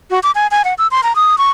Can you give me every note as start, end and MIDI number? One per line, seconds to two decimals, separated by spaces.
0.11 0.19 66
0.23 0.31 86
0.35 0.47 80
0.51 0.62 80
0.65 0.74 78
0.78 0.87 88
0.91 1.01 84
1.03 1.16 82
1.16 1.38 87
1.38 1.51 85